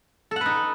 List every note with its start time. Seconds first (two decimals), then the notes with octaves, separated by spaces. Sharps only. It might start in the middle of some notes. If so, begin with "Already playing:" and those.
0.31 A4
0.36 F#5
0.41 B4
0.46 D#4